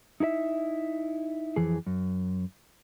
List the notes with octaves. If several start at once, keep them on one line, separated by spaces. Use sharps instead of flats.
D#4 E4 A4 E5
F2 E3 G#4
F#2